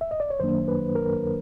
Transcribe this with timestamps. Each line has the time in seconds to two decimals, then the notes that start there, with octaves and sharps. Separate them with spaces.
0.01 E5
0.11 D#5
0.20 D5
0.30 C#5
0.40 F#2 D#3 F#3 A#3 D4 C5
0.68 B4
0.95 A#4